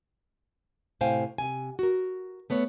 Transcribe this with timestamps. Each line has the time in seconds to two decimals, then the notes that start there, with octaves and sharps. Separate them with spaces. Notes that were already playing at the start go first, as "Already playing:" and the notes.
1.01 A2 C3 C5 F5 G5 G#5
1.38 C3 G#5
1.79 F#4 A#4
2.50 A3 B3 B4 C#5